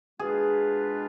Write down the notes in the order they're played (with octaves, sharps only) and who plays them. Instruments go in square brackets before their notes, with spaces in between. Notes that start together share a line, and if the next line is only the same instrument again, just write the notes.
[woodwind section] B2 G#3 D4 F4 B4 [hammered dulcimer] G#4